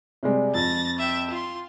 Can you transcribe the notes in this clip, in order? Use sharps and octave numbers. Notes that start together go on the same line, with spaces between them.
C3 G3 G#3
F2 A6 A#6
E5 G5
F4 C6